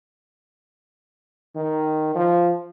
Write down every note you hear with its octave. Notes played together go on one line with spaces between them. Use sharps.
D#3
F3